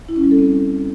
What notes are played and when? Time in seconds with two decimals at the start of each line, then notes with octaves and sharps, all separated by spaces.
0.09 E4
0.16 C#4
0.24 G3
0.31 A4
0.39 C4